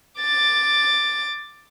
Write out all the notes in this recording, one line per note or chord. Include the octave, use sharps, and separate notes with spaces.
D6 A6